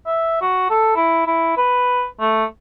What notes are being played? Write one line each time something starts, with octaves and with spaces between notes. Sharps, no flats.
E5
F#4
A4
E4
E4
B4
A3